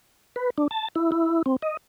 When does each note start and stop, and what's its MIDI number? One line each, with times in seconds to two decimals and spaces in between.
0.36 0.50 71
0.58 0.68 62
0.71 0.88 81
0.95 1.11 64
1.12 1.42 64
1.46 1.56 60
1.62 1.77 75